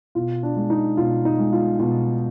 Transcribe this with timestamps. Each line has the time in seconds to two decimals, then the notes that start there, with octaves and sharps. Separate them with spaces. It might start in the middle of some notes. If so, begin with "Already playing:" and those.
0.15 B2 F4
0.43 D4
0.56 G#3
0.70 D#4
0.97 B2 F4
1.25 D#4
1.38 G#3
1.52 F4
1.79 B2 F4